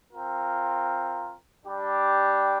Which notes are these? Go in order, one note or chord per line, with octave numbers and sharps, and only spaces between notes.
C4 F4 A#4
G3 D4 G4